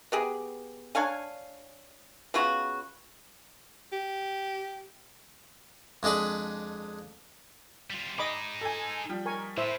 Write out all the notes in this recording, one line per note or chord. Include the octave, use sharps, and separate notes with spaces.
B3 G4 G#4
D4 C#5 F5 G#5
C#3 B3 F4 F#4
G4
F2 G#3 D4 G#4 B5
G3 F4
D#4 G#4 D#5 B5 D6
A4 G#5
F3 G3
A#4 G#5 C#6
A2 E4 C5 E5